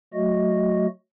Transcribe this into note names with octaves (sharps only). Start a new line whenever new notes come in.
F#3 A3 F#4 D#5